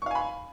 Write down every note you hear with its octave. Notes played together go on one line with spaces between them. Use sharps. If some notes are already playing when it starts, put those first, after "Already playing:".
F5 G#5 B5 C#6